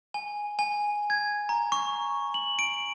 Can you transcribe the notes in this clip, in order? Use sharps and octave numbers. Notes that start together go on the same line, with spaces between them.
G#5
G#5
G#6
A#5
C#6
F#7
D7